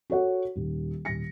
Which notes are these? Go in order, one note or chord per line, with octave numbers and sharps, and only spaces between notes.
F#4 A4 C#5 F#5
D#1
D#1 A#6 C#7